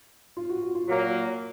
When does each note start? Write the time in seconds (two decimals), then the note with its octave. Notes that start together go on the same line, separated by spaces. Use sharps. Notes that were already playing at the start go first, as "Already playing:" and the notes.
0.37 F4
0.49 F#4
0.62 F#4
0.75 F4
0.87 A#2 F#3 A#3 F#4